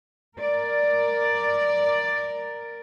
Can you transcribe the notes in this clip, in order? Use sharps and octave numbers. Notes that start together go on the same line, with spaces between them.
A#4 D5